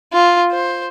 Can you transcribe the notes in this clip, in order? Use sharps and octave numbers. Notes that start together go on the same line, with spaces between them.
F4
C5